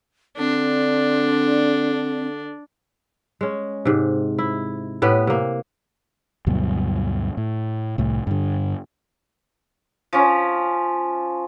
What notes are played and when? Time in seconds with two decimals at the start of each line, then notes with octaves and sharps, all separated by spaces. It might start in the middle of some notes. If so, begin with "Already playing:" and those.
0.38 D3 C4 D4
3.41 G#3 C#4
3.85 G#2 C3
4.39 E4
5.02 A2 B3 G4
5.27 C3 A#3
6.46 D2 G2 B2 F#3
7.37 A2
7.98 C2 A2
8.27 G2 D3
10.13 F3 C#4